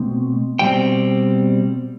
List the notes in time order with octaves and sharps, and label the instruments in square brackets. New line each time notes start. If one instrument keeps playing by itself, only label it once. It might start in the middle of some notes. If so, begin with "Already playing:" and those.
Already playing: [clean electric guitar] B2 A3 C4
B2 G3 C4 G5